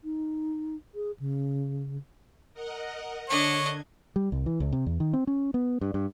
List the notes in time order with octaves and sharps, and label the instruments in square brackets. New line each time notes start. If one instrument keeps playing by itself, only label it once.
[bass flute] D#4
G#4
C#3
[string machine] A#4 D#5 F#5
[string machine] D3 G#6 [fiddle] D4 D#5 [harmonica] C#5
[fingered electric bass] G3
C2
E3
C#2
C3
E2
D#3
C4
C#4
B3
G2
G2